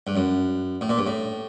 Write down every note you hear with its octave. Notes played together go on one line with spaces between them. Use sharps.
G2
F#2
A2
A#2
G2
A2